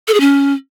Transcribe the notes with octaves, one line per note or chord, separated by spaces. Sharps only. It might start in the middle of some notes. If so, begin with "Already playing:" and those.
A4
G#4
C#4